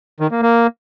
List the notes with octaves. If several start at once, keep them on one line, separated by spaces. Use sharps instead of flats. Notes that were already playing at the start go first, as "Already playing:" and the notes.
D#3
A#3
A#3